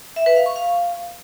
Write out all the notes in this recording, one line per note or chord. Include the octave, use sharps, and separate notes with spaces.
E5
B4
F5
C#6
F5